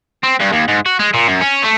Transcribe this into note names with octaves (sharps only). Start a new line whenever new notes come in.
C4
G2
D#2
G#2
F#4
G#3
A#2
F#2
C#4
A3